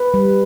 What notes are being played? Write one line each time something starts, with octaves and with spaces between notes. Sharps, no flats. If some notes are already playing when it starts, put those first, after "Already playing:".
Already playing: B4
G3